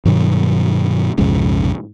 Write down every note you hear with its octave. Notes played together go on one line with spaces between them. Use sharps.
G2 B2 D#3 F#3
B1 F2 G#2 C#3